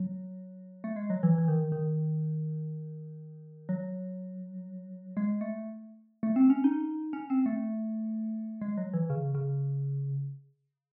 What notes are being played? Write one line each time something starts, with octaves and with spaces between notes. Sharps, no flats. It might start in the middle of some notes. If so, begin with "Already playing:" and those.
Already playing: F#3
A3
G#3
F#3
E3
E3
D#3
D#3
F#3
G#3
A3
A3
C4
C#4
D#4
C#4
C4
A3
G#3
F#3
E3
C#3
C#3